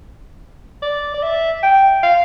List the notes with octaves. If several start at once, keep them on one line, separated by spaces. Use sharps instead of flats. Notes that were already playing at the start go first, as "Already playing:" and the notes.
D5
D5
E5
G5
F5